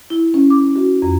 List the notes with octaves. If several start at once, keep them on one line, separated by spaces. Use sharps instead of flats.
E4
C#4
D6
F#4
F2